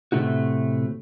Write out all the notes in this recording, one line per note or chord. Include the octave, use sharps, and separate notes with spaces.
A2 C3 G3 A3 D#4 F#4